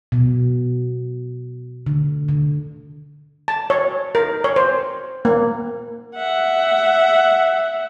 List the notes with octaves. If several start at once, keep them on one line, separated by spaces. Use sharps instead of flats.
B2
D3
D3
A5
C#5
A#4
C#5
C5
A#3
E5 F#5